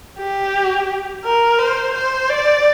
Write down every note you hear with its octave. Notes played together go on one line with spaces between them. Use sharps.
G4
A#4
C5
C5
D5